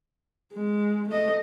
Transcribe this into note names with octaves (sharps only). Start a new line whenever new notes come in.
G#3
A3 D#5